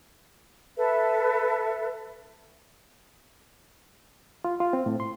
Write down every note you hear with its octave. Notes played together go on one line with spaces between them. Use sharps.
A4 B4 E5
F4
F4
C4
A2
C6